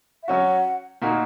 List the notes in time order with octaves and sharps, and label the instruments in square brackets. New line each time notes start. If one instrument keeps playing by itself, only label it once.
[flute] E5
[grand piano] F#3 C#4 F#4 [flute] F#5
[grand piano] A#2 A#3 D#4 F#4